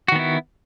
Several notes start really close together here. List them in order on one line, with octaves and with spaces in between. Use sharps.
F#4 D#3 B3 E4